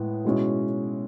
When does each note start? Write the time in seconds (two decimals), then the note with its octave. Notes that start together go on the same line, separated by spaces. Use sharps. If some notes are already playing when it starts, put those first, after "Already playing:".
Already playing: A2 G#3 B3
0.25 B2 G#3 C#4 E4